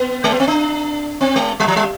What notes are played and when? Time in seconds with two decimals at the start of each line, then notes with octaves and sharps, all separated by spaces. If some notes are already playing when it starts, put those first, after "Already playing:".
Already playing: B3
0.24 G#3
0.32 B3
0.40 C4
0.47 D4
1.21 C4
1.36 G#3
1.60 G3
1.68 F3
1.76 G3